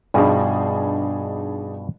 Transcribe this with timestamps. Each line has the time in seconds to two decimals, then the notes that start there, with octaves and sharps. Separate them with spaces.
0.14 G2 B2 F3 D4 D#4 G#4